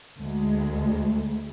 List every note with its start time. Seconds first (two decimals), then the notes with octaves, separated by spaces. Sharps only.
0.20 D2 G#3